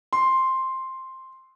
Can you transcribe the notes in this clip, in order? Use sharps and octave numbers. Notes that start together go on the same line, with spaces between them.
C6